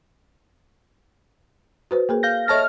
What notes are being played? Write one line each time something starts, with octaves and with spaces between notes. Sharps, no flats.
F#4 B4 C5
A#3 G#4 A#4
F5 G6 A#6
A4 C#5 D#5 E5 A5 F6 A#6